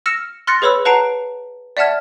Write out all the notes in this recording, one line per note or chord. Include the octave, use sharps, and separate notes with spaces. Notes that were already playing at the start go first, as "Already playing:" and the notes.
E6 F6 A#6 C#7 E7
C6 F6 F#6 A6 A#6 C#7
G#4 B4 C#5 B5 E6
B4 F#5 A5 A#5 C7 D7
D5 E5 F#5 A5 F6 G#6